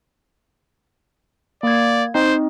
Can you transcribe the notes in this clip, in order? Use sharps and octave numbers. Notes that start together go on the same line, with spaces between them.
A#3 D5 G#6
C4 D#4 C5 D#5